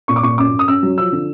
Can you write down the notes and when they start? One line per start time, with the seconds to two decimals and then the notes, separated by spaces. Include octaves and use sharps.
0.08 A#2 C#6
0.16 D6
0.23 A#2 C#6
0.38 F#2 D6
0.53 F#2
0.59 D#6
0.68 F#2 E6
0.83 F#3
0.98 F3 E6
1.12 D3